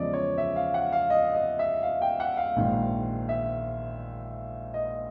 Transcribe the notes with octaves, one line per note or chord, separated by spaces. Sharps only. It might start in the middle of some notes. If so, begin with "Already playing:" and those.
Already playing: E2 C#3 F3 G#3 D5 D#5
C#5
E5
F5
F#5
F5
D#5
D#5
E5
F5
G5
F#5
F5
A#1 G#2 D#3
E5
D#5